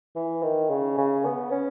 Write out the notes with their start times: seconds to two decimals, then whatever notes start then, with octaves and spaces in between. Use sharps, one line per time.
0.16 E3
0.43 D#3
0.70 C#3
0.98 C#3
1.25 B3
1.51 C#4